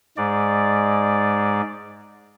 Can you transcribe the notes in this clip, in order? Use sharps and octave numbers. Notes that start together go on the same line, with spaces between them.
G#2 G#3 D5